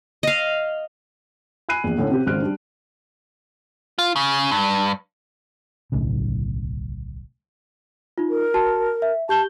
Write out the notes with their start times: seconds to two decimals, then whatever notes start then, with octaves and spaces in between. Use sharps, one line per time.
0.23 D#5 F5
1.69 G#5 B5 F#6 C7 D#7
1.84 A#1 E2
1.98 A2 D3 C#4 E4
2.10 C3 C4 G4
2.26 G#1 C#2 C5 F6 F#6 D7
2.42 G3 D4
3.99 F4
4.16 C#3
4.51 G2
5.92 D1 B1 A2 C#3
8.18 D#4 F4
8.30 A#4
8.54 F#4 A5
9.02 E5
9.29 G4 A5 G6 G7